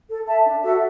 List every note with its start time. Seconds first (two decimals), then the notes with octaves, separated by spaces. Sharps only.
0.09 A4
0.27 E5 A5
0.45 D4
0.63 F#4 A4 E5